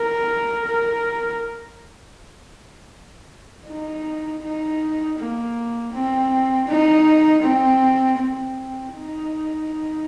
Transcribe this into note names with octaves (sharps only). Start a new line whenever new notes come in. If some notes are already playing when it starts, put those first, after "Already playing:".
Already playing: A#4
A#4
D#4
D#4
A#3
C4
D#4
C4
C4
D#4